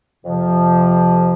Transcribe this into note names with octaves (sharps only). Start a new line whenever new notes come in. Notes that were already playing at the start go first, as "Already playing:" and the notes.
F2 C3 F3